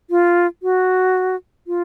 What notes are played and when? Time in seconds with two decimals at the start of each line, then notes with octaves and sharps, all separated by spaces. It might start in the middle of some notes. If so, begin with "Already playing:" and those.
0.10 F4
0.63 F#4
1.67 F4